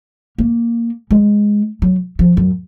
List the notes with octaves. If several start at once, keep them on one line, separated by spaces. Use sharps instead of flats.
A#3
G#3
F#3
F3
F#2